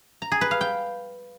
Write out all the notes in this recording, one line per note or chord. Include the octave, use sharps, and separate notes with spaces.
A#5
G#4
B4
F5
G5